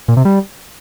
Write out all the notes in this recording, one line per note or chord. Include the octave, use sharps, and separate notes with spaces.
A#2
C3
G3